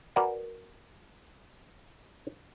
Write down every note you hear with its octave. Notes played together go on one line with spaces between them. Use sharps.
F#4 A#4 B4 D5 F#5 G#5